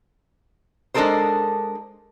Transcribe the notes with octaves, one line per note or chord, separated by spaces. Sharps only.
G#3 D4 D#4 A4 A#4 C5